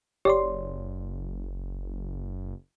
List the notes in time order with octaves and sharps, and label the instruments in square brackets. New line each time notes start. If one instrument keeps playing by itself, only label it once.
[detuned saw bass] F#1 [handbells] G4 [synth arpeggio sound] C#5 D5 C6